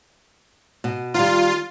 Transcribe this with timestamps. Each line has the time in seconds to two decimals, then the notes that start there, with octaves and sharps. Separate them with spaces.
0.84 B2
1.14 D#3 G3 F4